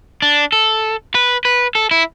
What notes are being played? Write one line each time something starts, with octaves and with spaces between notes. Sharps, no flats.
D4
A4
B4
B4
A4
E4